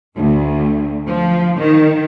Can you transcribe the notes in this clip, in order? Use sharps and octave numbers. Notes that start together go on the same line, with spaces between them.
D2
F3
D#3